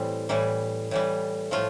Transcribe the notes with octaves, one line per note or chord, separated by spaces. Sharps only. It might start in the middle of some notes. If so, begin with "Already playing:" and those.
Already playing: A2 E3 G3 C4
A2 E3 G3
A2 E3 G3
A2 F3 A3 F4